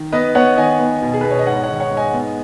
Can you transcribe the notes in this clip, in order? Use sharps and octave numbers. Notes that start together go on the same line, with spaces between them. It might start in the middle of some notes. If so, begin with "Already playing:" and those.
Already playing: D#3
B3 B4 D#5
B3 C#5 F#5
D#3 D#5 G#5
B3
B2
G#4
B4
B2
C#5
D#5
G#2 C#5 F#5
C#5 F#5
D#3
C#5 F#5
G#2
D#5 G#5
B3